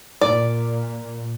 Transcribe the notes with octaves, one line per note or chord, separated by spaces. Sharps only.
A#2 D5